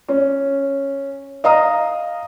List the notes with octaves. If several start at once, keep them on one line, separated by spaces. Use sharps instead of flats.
C#4
D#5 F5 A#5 D#6